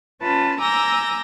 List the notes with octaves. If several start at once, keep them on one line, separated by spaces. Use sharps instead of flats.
C#4 F4 B4 A5
G#5 A#5 D6 E6 G6 A#6